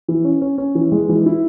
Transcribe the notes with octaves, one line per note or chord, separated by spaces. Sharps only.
E3
C#4
C#4
C#4
E3
G#3
E3
E4